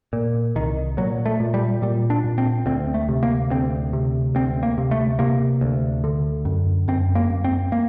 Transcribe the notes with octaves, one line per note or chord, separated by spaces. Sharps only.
A#2
C2 D#3
A#2 F#3
A3
A#2
G3
A#2 G3
D4
A#2
C4
D2 C4
A3
C3
A#3
D2 C4
C3
D2 C4
A#3
C3
A3
C3 A#3
D2
D3
F#2
F#2 C4
A#3
F#2
C4
A#3